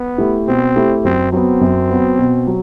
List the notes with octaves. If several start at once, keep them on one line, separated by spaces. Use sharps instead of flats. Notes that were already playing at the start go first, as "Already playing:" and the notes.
Already playing: B3
A3 E4 G4
B2 C4
A3 E4 G4
F#2 C4
F#3 B3 C4
F#2
F#3 B3
B2
F#3